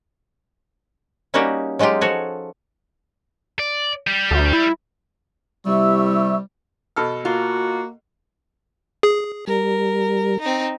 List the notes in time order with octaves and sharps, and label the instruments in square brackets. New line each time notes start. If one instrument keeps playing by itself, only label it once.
[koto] G3 A#3 C#4 D#4 F#4 G4
F#3 G#3 D#4 F4 G4
F3 F#4 A4 C#5 G#5
[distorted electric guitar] D5
G3 G4
[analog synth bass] D2
E4
[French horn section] C3 E4 [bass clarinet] G3 [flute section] E5 C#6 E6
[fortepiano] B2 A4 F6
[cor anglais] A#3 [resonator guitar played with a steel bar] F4 [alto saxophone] F#4
[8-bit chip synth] G#4
[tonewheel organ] G3 [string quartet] A#4
[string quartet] C4 D#4